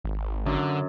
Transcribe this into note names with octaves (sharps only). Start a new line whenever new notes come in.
G#1
F#2 D3